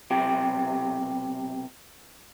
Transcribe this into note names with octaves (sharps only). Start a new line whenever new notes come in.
B1 C3 G4